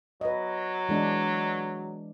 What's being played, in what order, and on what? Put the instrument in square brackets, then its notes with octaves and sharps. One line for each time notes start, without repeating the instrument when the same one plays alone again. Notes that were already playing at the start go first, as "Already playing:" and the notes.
[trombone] F#3 [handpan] B4 D#5
[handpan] E3 G#3 D4